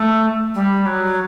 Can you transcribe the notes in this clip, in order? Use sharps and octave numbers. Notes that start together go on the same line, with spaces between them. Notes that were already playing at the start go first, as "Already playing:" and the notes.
Already playing: A3
G3
F#3